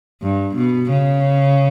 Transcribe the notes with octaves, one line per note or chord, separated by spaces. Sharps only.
G2
B2
C#3